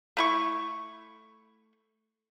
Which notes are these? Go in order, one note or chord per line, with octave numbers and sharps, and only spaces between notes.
A3 E4 C#6